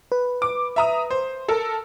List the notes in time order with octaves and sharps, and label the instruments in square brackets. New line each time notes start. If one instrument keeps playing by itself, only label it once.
[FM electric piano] B4
[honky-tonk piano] D6
E5 A#5 D#6
C5
A4 A#4